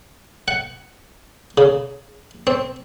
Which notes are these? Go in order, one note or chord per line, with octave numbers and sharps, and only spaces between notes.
F#5
C#3
C4